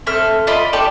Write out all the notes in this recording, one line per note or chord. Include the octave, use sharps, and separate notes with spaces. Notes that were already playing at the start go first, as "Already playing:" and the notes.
C4 A4 E5 F6
F4 D5 D#5 B5
D4 G4 A4 D5